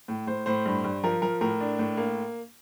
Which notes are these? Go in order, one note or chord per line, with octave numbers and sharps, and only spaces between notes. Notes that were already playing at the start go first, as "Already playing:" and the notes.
A2
A2 C5
A2 C5
G2
G2
F3 A#4
F3 A#4
A2 A#4
D4
A2
A#3